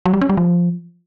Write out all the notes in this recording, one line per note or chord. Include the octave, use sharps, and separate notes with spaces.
F#3
G3
C#4
G3
F3